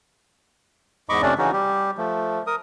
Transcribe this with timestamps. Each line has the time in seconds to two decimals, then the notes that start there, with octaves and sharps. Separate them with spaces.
1.09 E2 G#2 D#5 B5 C#6 D6
1.22 F2 C3 A3 C#4 D4 D5
1.38 C#3 E3 C#4 D#4 F#4
1.53 G3 G4
1.97 F3 A3
2.47 A#4 D#6